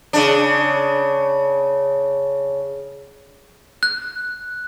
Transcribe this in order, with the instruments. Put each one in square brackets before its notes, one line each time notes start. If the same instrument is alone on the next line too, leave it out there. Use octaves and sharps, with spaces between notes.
[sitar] C#3 D4
[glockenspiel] F#6